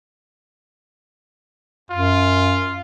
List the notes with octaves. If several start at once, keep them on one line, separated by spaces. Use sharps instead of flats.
F#2 F4